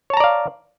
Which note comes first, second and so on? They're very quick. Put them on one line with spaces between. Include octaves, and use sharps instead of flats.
C#5 A5 A#5 D5 F5